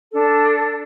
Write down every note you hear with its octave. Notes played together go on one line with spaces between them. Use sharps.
D4 A4